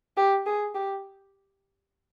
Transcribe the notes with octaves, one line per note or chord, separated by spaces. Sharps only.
G4
G#4
G4